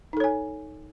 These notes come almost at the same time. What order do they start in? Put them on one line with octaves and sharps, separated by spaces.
D#4 A4 C#5 G#5